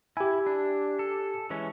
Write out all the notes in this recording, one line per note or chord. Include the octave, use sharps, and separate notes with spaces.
E4 G4 G#5
D4
A4
E3 G#3 C#4